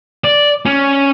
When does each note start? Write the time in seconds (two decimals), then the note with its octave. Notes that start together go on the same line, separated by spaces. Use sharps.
0.24 D5
0.66 C#4